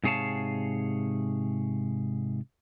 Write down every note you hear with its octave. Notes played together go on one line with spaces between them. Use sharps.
G#2 C3 G#4 C#5 F5 A5